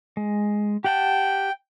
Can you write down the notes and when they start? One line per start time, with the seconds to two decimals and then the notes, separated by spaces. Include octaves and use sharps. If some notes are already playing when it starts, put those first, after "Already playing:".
0.17 G#3
0.84 G4 F#5 G5 A5